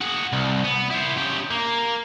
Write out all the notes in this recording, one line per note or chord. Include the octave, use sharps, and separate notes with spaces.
F#4 G#4
C2
B3
E4 C5
C#3 G4
A#3